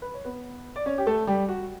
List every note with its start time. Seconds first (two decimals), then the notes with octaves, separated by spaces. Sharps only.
0.02 B4
0.14 C#5
0.24 B3 B4
0.76 D5
0.86 C#4 C#5
0.98 G4
1.07 A3 A4
1.27 G3 G4
1.49 F#4